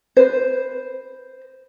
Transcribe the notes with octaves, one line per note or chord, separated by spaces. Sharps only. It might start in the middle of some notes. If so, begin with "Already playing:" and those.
B4 C5